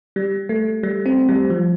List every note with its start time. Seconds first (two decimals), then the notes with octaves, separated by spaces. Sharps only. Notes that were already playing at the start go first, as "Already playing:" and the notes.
0.16 G3
0.49 A3
0.83 G3
1.06 C4
1.29 G3
1.50 F3